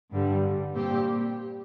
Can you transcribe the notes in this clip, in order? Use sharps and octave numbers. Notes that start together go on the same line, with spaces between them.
G2 D3 G3
A#2 G3 C4 G4